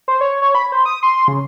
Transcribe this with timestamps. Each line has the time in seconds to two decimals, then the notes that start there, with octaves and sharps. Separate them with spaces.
0.08 C5
0.21 C#5
0.42 C#5
0.55 B5
0.72 C5
0.85 D#6
1.03 C6
1.28 C#3